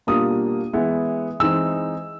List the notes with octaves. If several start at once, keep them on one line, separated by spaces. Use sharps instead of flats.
B2 G3 A#3 D4 F4 D#6
E3 G#3 B3 E4
E3 G#3 C4 D#4 E6